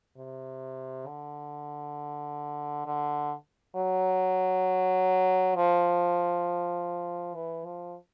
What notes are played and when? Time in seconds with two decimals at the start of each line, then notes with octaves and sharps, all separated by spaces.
0.17 C3
1.07 D3
2.86 D3
3.76 F#3
5.55 F3
7.35 E3
7.64 F3